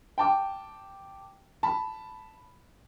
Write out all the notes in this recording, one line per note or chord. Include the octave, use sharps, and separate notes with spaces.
G5 A5 D6
A5 B5